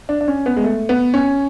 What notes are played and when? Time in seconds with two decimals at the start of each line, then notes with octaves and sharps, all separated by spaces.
0.09 D4
0.21 D4
0.28 C#4
0.46 B3
0.57 G#3
0.64 A3
0.89 B3
1.14 C#4